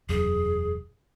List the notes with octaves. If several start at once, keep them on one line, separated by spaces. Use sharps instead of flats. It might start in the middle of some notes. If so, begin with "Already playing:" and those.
E1 F#2 G#4